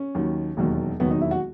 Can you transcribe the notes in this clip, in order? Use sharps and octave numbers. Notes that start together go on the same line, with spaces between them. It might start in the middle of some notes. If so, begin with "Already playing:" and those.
Already playing: C#4
D#2 D#3 F#3
E1 D#2 D#3 F#3
E1 D#2 D#3 F#3 B3
D#4
E4
F#4